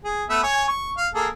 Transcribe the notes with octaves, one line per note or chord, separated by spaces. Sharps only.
G#4
A3 B3 E5
C#5 G#5
C#6
F5
A#3 G#4 A4